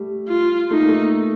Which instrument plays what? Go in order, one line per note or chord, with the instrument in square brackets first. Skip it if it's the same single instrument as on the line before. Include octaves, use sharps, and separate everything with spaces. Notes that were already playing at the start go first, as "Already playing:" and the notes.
Already playing: [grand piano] G3 A3
[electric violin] F4
[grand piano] A3 [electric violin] D#4
[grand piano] A#3
A3